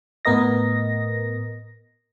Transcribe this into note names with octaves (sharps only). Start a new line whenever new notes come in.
A2 B3 A#4 D#5 A#6